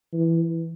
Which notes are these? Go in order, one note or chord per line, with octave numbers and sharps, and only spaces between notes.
E3